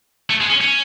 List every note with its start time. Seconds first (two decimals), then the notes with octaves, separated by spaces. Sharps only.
0.30 A3
0.41 G#3
0.50 C#4
0.61 C#4